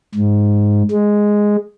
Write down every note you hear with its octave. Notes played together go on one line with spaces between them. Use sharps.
G#2
G#3